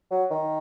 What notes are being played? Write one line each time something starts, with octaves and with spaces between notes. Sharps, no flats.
F#3
D#3